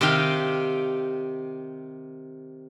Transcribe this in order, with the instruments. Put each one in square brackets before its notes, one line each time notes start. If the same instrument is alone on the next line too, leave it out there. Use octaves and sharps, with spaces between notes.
[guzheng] C3 D#3 G4 F5 G5